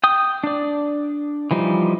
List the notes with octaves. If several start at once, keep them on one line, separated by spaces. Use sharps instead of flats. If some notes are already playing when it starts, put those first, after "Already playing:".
G5 D#6
D4 D5
E3 F3 G3 D#4